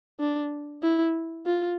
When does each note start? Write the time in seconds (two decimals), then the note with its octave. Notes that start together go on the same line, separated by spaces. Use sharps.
0.20 D4
0.83 E4
1.46 F4